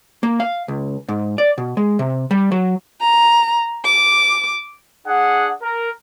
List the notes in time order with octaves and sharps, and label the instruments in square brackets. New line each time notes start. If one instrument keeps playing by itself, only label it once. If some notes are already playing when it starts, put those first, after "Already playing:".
[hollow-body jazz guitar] A#3
F5
C#2
G#2
D5
B2
G#3
C3
G3
F#3
[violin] A#5
D6
[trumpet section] D4 G#4 F#5
A#4